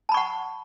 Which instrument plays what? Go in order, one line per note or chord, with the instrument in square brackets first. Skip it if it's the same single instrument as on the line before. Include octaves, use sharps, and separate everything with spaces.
[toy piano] A5
B5
C#6
F#5